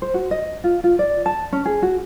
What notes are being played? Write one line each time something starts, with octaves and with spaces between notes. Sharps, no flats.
C5
F#4
D#5
F4
F4
D5
A5
C#4
G#4
F#4